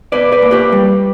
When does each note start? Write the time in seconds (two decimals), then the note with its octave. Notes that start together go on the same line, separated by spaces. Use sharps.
0.12 B2 B4 D5
0.32 B4 D5
0.42 A#3
0.51 G4 B4
0.72 G3